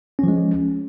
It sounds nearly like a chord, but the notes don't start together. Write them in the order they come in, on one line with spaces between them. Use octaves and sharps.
C#4 F3 G#3